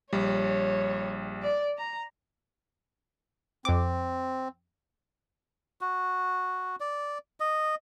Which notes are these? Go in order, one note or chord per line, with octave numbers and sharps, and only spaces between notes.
A#1 G3 C#5
D5
A#5
F2 C4 D6
F#4
D5
D#5